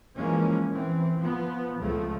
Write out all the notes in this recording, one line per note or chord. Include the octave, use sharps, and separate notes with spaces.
E3 F3 G#3 A#3 C#4
E3 C4
F3 B3
C#2 F3 A3